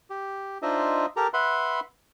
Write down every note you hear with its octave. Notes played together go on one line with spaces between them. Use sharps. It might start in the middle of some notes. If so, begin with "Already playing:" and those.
G4
D4 D#4 F4 C5 D#5 E5
G4 A4 A#4 A#5
B4 E5 F#5 B5 C6